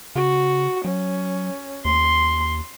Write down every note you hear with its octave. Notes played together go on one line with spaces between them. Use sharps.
C#3 F#4
F#3 C#4
D#2 C6